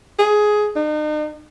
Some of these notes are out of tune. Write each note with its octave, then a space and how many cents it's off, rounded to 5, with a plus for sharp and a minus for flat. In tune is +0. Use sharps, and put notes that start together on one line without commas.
G#4 +15
D#4 -40